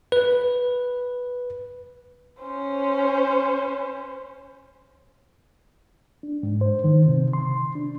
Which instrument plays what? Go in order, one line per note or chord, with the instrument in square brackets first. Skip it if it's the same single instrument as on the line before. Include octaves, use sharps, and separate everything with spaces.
[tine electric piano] B4
[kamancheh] C#4 C5
[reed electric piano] D4
G#2
C5
D#3
C3
C6
D4